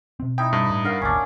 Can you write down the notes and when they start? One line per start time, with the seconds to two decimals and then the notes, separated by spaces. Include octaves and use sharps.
0.20 B2 C4
0.38 D#4 E4 G5
0.53 G2
0.70 A2
0.85 D4 A#4 F5 F#5
1.01 G#1 D2 A#2 C#4 D4